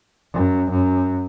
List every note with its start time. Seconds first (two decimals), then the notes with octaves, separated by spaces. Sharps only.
0.34 F#2
0.71 F#2